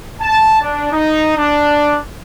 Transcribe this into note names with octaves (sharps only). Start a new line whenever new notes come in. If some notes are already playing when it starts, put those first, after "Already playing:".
A5
D4
D#4
D4